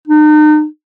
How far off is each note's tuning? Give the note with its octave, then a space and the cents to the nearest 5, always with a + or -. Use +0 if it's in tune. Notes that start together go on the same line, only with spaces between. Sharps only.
D#4 -40